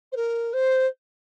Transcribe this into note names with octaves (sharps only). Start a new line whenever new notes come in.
C5
A#4
C5